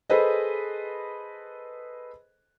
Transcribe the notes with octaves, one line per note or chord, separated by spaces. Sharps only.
G#4 A4 B4 C5 D#5